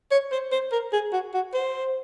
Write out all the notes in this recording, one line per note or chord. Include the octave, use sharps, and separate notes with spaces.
C#5
C5
C5
A#4
G#4
F#4
F#4
C5